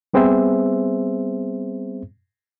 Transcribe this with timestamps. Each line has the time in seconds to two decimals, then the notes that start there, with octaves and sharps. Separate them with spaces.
0.14 G3 B3 C4 G#4 C5 E5